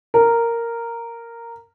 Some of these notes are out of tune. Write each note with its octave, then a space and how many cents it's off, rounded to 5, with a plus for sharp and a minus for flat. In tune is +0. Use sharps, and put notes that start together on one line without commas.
A#4 -5